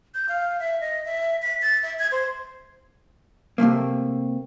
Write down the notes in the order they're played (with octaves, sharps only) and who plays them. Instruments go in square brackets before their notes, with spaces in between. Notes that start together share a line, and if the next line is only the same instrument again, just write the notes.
[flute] G6
F5
E5
D#5
E5
B6
A6
E5
G#6
C5
[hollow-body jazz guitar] C3 F3 A3 A#3